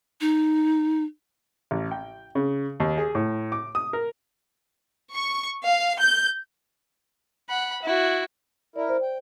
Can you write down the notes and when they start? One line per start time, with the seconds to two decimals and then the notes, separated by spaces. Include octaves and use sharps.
0.21 D#4
1.71 A1
1.91 G5
2.35 C#3
2.80 D#2
2.98 G#4
3.15 A2
3.52 D6
3.75 D#6
3.93 A#4
5.15 C#6
5.66 F5
6.01 G6
7.49 F#5 B5
7.83 E4 F#4
8.76 E4 A#4 D5
8.89 C5
9.02 G5